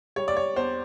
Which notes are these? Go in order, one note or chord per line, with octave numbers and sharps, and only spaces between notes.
G3 C#5
D5
C#5
E2 C5